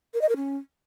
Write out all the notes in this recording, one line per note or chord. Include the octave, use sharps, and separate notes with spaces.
A#4
D#5
A#4
C#4